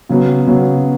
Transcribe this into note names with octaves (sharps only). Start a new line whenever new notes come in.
C#3 F#3 B3
C#3 F#3 B3